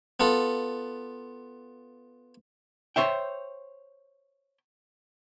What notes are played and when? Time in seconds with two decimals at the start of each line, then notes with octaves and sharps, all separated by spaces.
0.20 B3 F4 A4
2.96 C5 C#5 E5 G5